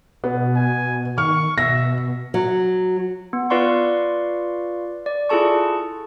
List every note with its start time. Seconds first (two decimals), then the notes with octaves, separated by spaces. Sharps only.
0.24 B2 B3
0.56 G#5
1.18 D#3 C#6 F6
1.58 B2 E5 A#6
2.34 F#3
3.33 B3
3.50 F4 B4 D5 F5 C6 C#6
5.06 D5
5.29 E4 F4 G#4 A4 A5 C#6